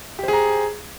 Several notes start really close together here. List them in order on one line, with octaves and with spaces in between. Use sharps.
G4 C5 G#4 A#5